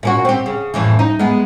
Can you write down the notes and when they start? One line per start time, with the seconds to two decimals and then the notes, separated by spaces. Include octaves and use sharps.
0.03 A#2 C#4 F#4
0.25 C4 G4
0.46 C#3
0.74 F2 A2 E3
0.99 D#4
1.19 G#3 B3